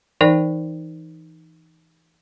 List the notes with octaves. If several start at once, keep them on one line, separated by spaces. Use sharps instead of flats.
E3 D#4 A#4 D5 G5